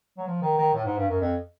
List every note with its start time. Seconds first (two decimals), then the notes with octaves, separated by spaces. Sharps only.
0.18 F#3
0.27 F3
0.42 D#3
0.58 D#3
0.74 A2
0.85 G#2
0.98 G2
1.09 F#2
1.21 F2